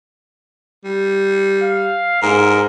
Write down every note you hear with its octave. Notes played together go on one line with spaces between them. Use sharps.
G3
F5
G#2 A#4